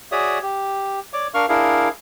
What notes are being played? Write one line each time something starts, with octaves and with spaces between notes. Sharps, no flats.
F#4 G#4 C#5 D5 E5 D#6
G4
C#5 D5 D6
D4 A#4 F5 C#6 F6
D4 E4 G#4 A#4 F5